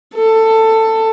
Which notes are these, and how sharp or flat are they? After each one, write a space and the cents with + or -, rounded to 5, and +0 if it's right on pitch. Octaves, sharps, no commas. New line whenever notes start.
A4 +15